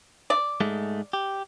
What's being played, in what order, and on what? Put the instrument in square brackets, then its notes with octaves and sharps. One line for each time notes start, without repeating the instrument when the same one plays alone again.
[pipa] D5
[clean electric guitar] G#2 G#3 A3
G4